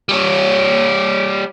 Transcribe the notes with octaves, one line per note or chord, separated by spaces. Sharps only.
G3 C#5